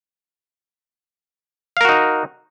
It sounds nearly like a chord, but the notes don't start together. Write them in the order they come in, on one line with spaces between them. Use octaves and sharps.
F5 A#4 F#4 D#4